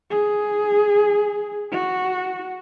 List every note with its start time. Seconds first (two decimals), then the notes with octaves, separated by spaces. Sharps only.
0.11 G#4
1.72 F#4